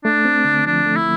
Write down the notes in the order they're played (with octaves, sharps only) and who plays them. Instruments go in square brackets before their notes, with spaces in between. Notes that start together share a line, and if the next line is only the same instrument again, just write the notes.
[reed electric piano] A3 [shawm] D4
[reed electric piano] C4
D3
[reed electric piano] F3 [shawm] D4
[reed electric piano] A3
[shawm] E4